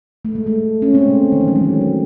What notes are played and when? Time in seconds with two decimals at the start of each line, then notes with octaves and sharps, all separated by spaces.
0.25 A3
0.35 G#3
0.47 A3
0.82 C#4
0.94 G#3 C4
1.32 D#3
1.40 E3
1.48 F#3
1.56 G#3
1.64 A3
1.81 G#3